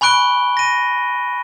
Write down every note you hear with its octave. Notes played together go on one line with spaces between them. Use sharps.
G#5 B5 C#6 F#6 D7 G7
A#6 D#7